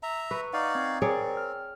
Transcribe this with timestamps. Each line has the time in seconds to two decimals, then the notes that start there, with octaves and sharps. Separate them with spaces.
0.03 E5 A#5
0.31 B4 C#6
0.53 D#4 D5 F5 F#5 A#5 C#6
0.75 C4 G#6
1.02 C4 G#4 A#4 C#5 D5 A#5
1.37 F6